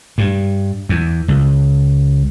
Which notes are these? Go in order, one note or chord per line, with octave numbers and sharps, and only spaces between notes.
G2
E2
C#2